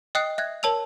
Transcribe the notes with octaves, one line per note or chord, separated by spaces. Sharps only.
D#5 G5 D#6 F#6 C7
E5 F#6 G#6
A#4 C#5 A5 E6 F7